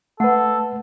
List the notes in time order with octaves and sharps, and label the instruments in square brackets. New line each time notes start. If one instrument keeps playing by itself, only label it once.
[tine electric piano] A3 [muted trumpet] A4 [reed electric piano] B4 A5 [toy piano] F#5